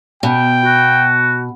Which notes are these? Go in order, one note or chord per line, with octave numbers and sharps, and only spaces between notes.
B2 G5
F#4